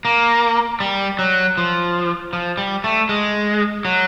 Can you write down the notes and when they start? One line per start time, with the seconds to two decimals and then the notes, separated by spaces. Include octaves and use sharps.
0.05 A#3
0.80 G3
1.19 F#3
1.57 F3
2.33 F3
2.58 G3
2.84 A3
3.09 G#3
3.85 F#3